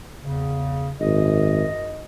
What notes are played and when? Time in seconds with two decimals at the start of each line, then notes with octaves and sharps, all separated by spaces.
0.21 E2 C#3
1.00 G#1 F#2 D#5